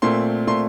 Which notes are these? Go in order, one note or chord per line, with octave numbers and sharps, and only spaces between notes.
A#2 A3 C4 C6
A#2 A3 C4 C6